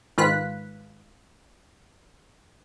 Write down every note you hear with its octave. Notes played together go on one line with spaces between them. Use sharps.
G#2 D#3 F4 B4 F#6 B6